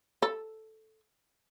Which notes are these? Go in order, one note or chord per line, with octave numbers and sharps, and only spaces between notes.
A4